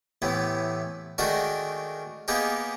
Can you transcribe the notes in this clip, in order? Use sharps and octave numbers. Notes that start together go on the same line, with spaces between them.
A2 C3 E3 B3
D#3 G#3 A3 D4 F#4 A#4
A#3 B3 D#4 G4 G#4 A#4